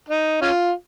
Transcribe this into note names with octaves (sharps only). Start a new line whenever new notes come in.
D#4
C#4 F4